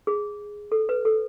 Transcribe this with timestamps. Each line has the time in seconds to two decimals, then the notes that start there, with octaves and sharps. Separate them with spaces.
0.07 G#4
0.72 A4
0.89 B4
1.05 A4